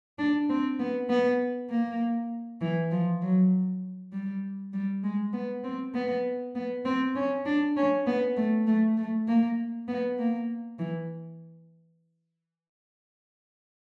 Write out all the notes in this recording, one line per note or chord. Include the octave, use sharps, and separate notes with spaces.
D4
C4
B3
B3
A#3
E3
F3
F#3
G3
G3
G#3
B3
C4
B3
B3
C4
C#4
D4
C#4
B3
A3
A3
A3
A#3
B3
A#3
E3